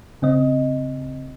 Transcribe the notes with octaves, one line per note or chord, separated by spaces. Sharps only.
C#3 C4 D#5